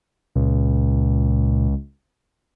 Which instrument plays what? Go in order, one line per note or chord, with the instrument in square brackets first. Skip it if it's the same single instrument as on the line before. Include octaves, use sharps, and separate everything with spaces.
[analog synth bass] C#2 [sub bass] A#2